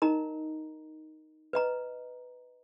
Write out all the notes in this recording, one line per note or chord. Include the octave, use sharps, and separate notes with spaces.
D#4 A#4 D#5 A#5
B4 D#5 A#5